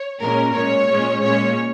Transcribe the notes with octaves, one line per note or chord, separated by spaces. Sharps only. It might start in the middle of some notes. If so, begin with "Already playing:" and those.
Already playing: C#5
A#2 G#3 C#4 A#4
A#2 G#3 C#4 C#5
A#2 G#3 C#4
A#2 G#3 C#4 C#5